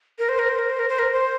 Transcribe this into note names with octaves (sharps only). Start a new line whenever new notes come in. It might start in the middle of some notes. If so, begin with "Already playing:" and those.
A#4
C5
A#4
C5
A#4
C5
A#4
C5
A#4
C5